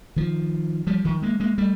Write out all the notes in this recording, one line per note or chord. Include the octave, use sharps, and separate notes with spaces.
D#3 F3
F3 G3
D#3 F3
G#3 A#3
G#3 A#3
G3 A3